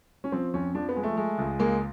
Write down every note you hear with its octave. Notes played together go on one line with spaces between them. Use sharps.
C#4
F3 C4
F2 C#4
F3 D4
B3
G#3
A3
G#3
C#2
G#3 A#3